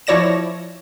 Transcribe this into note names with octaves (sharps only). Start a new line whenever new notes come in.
F3 E4 C#5 D5 A#6 E7